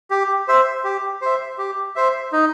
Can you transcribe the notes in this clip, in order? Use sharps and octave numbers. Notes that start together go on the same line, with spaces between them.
G4
C5 E5
G4
C5 E5
G4
C5 E5
D#4